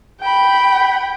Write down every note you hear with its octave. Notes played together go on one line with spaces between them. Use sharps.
G5 B5